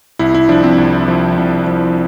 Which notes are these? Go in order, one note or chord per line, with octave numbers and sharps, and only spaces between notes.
C2 E4
E4
F3 D4
C4
C2
F3
C2
F3